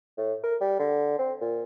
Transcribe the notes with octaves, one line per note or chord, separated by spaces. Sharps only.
A2
A#4
G3
D3
C4
A#2